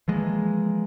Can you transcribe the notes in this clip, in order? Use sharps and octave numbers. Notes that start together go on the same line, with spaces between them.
E3 F3 G#3 A#3